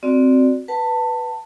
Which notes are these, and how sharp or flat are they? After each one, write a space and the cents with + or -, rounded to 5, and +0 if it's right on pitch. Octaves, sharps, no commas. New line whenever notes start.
C4 -5 F#4 +0 D5 +0
B4 +0 F#5 +30 A5 +20